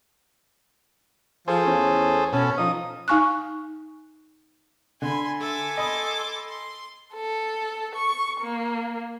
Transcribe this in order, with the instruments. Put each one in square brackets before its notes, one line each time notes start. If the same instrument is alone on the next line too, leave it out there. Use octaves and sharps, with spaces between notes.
[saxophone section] F3 [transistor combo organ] G#4 A4 C5
[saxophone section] E2 A3 C#4
[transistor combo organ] B2 A4 [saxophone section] C#4
[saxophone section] F3 D#4 [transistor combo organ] D#6
[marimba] D#4 F5 G#5 C#6 F6 F#6
[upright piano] D3 [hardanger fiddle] G#5 B5 [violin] C6
[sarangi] A4 [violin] E5 D6 [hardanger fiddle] G#5
[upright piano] D#5 B5 D#6 [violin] C6 D6
[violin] C6
[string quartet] A4
C#6
A#3